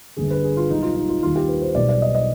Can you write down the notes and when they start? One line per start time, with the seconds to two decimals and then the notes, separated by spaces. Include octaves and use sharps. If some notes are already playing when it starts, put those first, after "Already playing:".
0.17 G1 G2 D3 G#4
0.31 B4
0.43 G#4
0.57 F4
0.70 B1 B2 G3 D#4
0.82 F4
0.96 D#4
1.09 F4
1.22 D#2 D#3 G3 F4
1.36 G4
1.49 B4
1.62 C5
1.75 B1 B2 G3 D5
1.89 D5
2.02 D#5
2.15 D#5